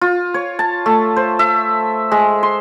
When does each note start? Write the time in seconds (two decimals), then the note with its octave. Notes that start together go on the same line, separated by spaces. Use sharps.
0.01 F4
0.34 C#5
0.59 A5
0.86 A3
1.16 C5
1.39 E5
2.12 G#3
2.43 C6